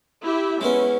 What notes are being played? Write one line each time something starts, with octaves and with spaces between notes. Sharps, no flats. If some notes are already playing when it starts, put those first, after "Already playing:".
E4 G4 E5
G#3 B3 C#4 E4